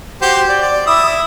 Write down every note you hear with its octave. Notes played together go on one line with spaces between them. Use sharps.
F#4 G4 C5
D5
D5
E4 D#6 E6